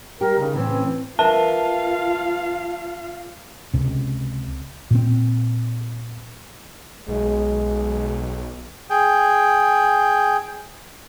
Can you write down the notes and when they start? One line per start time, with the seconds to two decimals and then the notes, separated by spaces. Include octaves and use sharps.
0.21 G3 G4 A#4
0.39 C#3 D#4
0.55 A2 E3 C4 C#4
1.19 F4 A#4 B4 E5 F5 A5
3.74 C#2 C3
4.91 A#2 C4
7.08 B1 G#3
8.90 G#4 G5